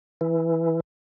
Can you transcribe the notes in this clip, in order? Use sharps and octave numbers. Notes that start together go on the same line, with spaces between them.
E3